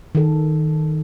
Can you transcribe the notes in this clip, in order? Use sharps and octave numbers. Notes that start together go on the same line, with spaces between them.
D#3 A4